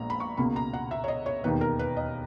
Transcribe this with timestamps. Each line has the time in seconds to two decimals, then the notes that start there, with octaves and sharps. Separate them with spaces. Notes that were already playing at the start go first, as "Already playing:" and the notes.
Already playing: A#1 A#2 G#3 B3 A#5
0.10 B5
0.20 C#6
0.37 C#2 B2 A#3 B5
0.56 A#5
0.73 F#5
0.91 E5
1.04 C#5
1.08 D#5
1.26 C#5
1.44 E1 D#2 D#3 A#3 B4
1.61 A#4
1.79 B4
1.97 D#5